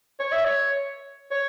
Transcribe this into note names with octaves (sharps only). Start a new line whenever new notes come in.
C#5
E5
C#5
C#5